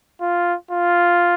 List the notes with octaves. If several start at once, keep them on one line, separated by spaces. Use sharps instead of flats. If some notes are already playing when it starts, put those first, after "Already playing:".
F4
F4